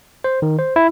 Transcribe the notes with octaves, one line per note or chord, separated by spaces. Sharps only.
C5
D#3
C5
E4